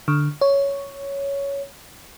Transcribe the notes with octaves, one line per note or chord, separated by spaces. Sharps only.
D3
C#5